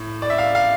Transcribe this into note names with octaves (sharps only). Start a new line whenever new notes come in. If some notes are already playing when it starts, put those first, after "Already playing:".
Already playing: A2
D5
E5
F5
F5